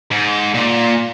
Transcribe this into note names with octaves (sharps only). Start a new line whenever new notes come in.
G#2
A#2